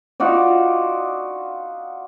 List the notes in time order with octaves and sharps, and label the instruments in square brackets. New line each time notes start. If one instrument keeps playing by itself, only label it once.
[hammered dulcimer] D#4 F4 F#4 D5